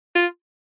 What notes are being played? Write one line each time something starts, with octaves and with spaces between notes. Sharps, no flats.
F4